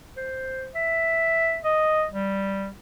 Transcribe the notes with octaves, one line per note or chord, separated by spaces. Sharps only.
C5
E5
D#5
G3